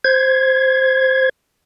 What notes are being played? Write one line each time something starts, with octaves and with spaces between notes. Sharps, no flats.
C5 G#6